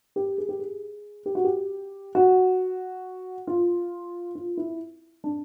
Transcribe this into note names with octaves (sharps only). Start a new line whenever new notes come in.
G4
G#4
G4
G#4
G4
F#4
G4
F#4
F4
F4
E4
D4